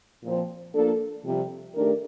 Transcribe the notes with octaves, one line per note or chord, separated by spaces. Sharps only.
A#2 F3 C4
F3 A#3 D4 A4
F2 C3 G3
D#3 A3 D4 G4 A#4